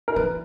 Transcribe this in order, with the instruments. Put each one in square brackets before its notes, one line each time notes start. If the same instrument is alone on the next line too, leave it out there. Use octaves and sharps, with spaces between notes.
[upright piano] A#4
[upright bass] E3 [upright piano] B4